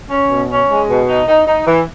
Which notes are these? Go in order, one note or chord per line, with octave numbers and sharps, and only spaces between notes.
C#4
B2
C#4
G#3
B2
D#4
D#4
D#4
E3